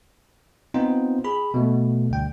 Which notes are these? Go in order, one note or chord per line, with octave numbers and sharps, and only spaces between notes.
B3 C4 D#4 F4 C5
G#4 B5
B2 A3
D2 G2 G5